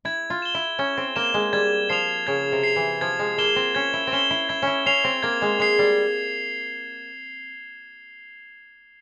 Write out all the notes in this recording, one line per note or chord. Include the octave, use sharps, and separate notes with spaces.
E4 G#6
F4
E7 G7
E4
C#4 G#6
C4
A#3 E7 G7
G#3
G3 G#6
F3 C7 F7
C#3 G#6
C3
C7 F7
E3
F3 G#6
G#3
A#3 E7 G7
C4
C#4 G#6
E4
C4
C#4 E7 G7
E4
E4 G#6
C#4 E4
C#4 C7 F7
C4
A#3 G#6
G#3
G#3 C7 F7
G3